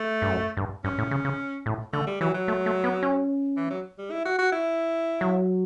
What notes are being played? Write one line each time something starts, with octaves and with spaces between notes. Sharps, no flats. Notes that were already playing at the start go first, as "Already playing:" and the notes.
Already playing: A3
G2
F#2
G2
G2 C#4
A2
C#3
C#3
A2
D3 A3
G3
E3 F#3
F#3
A3
A3
B3
C#4
E3
F#3
G3
E4
F#4
F#4
E4
F#3